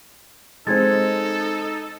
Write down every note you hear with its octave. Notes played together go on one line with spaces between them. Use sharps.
G#3 C4 D#4 A4 G#6 A6